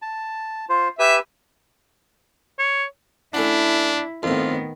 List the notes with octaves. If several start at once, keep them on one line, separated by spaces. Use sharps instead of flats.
A5
F4 C5
G4 B4 E5 G#5
C#5
A3 C#4 D4 E4 F#5
F2 A2 D#3 B3 F4